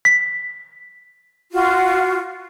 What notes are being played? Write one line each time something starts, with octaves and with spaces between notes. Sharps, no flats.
B6
F4 F#4